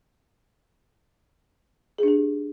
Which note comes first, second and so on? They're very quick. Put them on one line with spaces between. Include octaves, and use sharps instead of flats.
G#4 D4 G4